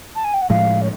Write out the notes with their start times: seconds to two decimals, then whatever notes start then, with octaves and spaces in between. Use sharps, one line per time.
0.15 A5
0.24 G#5
0.33 G5
0.41 F#5
0.49 A2 F3 G#3 F5
0.81 C#5